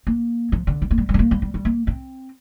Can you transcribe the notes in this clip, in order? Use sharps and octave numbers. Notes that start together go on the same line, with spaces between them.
A#3
F3
D3
G3
A#3
G3
G3
C4
A#3
G3
G3
G3
A#3
C4